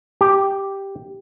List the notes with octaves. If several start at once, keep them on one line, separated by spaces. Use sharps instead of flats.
G4